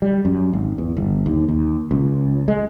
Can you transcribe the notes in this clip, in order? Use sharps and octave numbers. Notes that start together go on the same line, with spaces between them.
G3
F#2
G#1
E2
G1
D#2
D#2
C#2
G#3